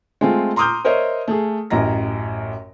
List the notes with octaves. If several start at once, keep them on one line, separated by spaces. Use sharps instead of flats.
G#3 A3 C4 F4
A#5 C6 D6 D#6 F6 G6
A#4 C5 C#5 D#5 E5
A3 G#4
A1 F#2 D#5 A#5 A#6